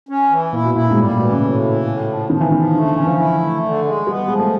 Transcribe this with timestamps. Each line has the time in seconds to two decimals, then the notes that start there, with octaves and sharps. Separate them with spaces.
0.09 C#4
0.30 E3
0.53 A#2 E4
0.64 B2
0.74 A#2 E4
0.90 G#2
0.97 A2 G3
1.08 A#2
1.19 B2 E3
1.30 C#3
1.41 A2
1.64 E3
1.85 A2
2.07 F3
2.30 D#3 F3
2.41 E3
2.52 D#3 F3
2.74 D3 A3
2.84 D3
2.96 E3 C#4
3.07 F3
3.18 E4
3.41 A3
3.63 D3
3.84 G#3
4.07 G3 B3
4.28 F3 G#3
4.39 A3